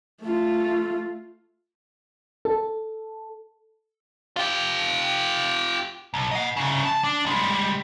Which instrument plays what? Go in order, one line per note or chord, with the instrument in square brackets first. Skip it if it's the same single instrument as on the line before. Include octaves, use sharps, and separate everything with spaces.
[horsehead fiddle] A3 F4
[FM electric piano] A4
[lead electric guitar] F4 G4
B1
D#5 F#5
C2 C#3
A5
D4
G3 G#3